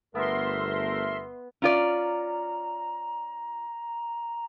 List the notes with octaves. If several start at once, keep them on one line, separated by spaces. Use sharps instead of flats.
G1 A3 B3 A#4 E5 C6
C#4 F4 D5 A#5